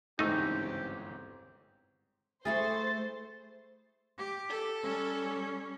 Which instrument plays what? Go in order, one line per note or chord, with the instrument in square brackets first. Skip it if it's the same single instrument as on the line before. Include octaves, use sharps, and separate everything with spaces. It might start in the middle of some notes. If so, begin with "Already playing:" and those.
[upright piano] G1 G#2 E3 [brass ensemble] C#2 C4 [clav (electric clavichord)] A3 D#4 [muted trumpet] G4
[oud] A3 E4 G#4 [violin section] C5 [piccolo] A6
[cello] G4
[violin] A4
[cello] G3 C#4